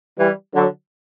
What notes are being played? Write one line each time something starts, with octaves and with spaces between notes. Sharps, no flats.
E3 G3
D3 F#3